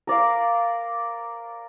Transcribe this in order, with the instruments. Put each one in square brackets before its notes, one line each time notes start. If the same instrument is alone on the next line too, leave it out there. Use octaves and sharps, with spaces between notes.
[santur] A#4 D5 F5